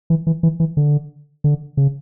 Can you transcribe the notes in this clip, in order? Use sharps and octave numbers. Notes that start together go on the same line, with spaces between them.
E3
E3
E3
E3
D3
D3
C#3